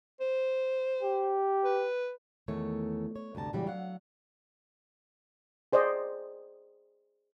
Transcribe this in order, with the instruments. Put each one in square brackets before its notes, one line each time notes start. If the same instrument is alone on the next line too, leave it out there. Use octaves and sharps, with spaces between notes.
[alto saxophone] C5
[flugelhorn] G4
[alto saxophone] B4
[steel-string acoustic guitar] E2 D#3 A3 C#5
C#5
D2 G2 C3 A5 A#5
A#2 C#3 E3 F#3 G3
F#3 F5 F#5
[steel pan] G#4 C5 D5 D#5